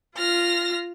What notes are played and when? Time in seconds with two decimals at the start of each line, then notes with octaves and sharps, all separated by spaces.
0.17 F4 F6 A#6